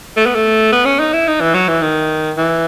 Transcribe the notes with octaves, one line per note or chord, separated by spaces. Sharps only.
A3
B3
A3
B3
C#4
D#4
E4
D#4
E3
F#3
E3
D#3
E3